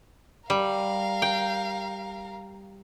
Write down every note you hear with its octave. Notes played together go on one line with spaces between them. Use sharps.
G3 A#4 F5
G5